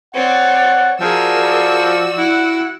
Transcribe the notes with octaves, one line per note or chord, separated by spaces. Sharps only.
C4 C#5 D5 F#5
F3 F#4 G#4 A#4 D5 E6
E4 F#5